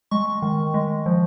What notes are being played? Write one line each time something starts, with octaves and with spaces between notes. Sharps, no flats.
G#3 C#6
D#3
G#3
F3